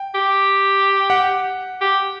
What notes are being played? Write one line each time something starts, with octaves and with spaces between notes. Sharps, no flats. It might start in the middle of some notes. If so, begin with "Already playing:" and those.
Already playing: G5
G4
F#5
G4